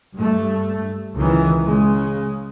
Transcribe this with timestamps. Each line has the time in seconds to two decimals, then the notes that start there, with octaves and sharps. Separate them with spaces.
0.14 G2 A3
1.16 C#2 D#3 E3
1.65 C#3 G#3